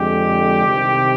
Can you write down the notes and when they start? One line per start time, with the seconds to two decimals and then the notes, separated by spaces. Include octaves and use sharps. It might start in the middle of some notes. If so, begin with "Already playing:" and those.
Already playing: F2 D3 G#3 G4
0.67 C2 C3 D#3